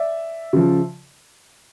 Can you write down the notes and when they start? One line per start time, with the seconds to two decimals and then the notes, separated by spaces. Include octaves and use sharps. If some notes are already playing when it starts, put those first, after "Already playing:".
Already playing: D5 E5
0.53 C#3 F3